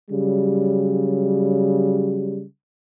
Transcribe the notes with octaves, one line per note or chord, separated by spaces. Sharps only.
C#3 F#3 G3